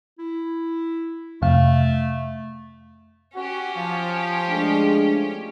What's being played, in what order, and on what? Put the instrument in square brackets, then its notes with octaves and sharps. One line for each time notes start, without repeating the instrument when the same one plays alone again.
[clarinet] E4
[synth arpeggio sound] F2 C3 F5 [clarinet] A3
[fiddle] C#4 G4 [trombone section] F#4
[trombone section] F3
[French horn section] G#3 A3 D4